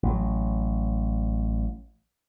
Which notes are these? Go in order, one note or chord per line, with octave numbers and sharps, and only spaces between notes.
A1 F#3